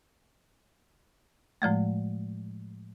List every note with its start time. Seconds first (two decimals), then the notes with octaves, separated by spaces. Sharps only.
1.62 A2 F3 G#3 A3